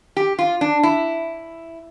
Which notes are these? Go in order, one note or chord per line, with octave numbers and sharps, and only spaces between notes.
G4
F4
D4
E4